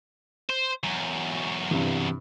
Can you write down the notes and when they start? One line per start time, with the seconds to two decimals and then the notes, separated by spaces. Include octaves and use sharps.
0.49 C5
0.84 E2 F#3
1.71 G2 C3 E3